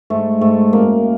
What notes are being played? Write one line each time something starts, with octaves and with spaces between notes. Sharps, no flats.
G#2 A3
G#2 A3
F#2 A#3